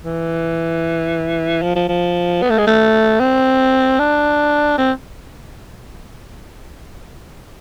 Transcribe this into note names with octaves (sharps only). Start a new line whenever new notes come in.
E3
F3
F3
F3
B3
A3
G#3
A3
C4
D4
C4